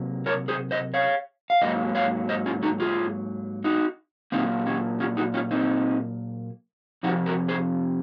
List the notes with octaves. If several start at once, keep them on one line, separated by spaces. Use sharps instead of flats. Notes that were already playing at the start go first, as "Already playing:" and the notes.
Already playing: C3 F#3 A#3
A#4 C#5
G#4 C5
C5 D#5
C#5 F5
F5
G#2 F#3 A#3 C5 D#5
C#5 F5
C5 D#5
C#4 F4
D#4 F#4
F4 G#4
D#4 F#4
A#2 F#3 A#3 C4 D#4
C#4
C#4 F4
D#4 F#4
C#4 F4
C4 D#4
F2 C3 F3 D#4 F#4
F#4 A#4
G#4 C5